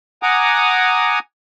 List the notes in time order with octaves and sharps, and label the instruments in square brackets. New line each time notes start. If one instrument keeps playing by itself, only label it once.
[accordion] F#5 G#5 A#5 D6 D#6